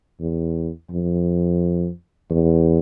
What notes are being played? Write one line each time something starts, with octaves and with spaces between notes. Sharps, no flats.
E2
F2
E2